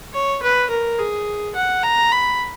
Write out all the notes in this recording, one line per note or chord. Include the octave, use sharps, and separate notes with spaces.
C#5
B4
A#4
G#4
F#5
A#5
B5